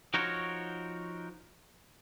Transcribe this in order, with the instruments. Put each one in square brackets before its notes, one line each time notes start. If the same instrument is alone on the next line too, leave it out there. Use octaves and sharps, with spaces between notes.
[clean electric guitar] F3 D#4 F#4 A#4 C5 C#5